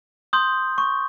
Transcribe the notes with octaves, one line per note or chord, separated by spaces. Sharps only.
C6 D#6 G6
C#6